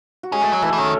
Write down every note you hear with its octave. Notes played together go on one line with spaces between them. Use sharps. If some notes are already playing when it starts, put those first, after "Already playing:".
F#4
G#3 C#4 G#4
A3
F#3
E3 A3 A4
E3
D#3 C#4 C#5